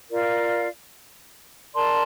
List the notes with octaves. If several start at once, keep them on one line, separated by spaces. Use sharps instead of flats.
F4 A#4 D5 F5
A#4 D5 A5 C6